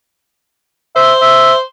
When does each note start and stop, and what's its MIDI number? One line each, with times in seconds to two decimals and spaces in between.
0.96 1.61 72
0.96 1.13 76
1.21 1.52 76